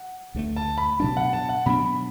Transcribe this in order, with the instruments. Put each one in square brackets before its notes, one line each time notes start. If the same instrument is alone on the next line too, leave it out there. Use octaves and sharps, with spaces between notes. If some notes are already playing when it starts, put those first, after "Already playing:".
Already playing: [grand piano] F#5
[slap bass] D2 D3 F#3 A3
[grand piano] A5
B5
[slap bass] B2 F#3 D4 [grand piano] A5
[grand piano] F#5
A5
F#5
[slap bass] B2 F#3 D4 [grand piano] B5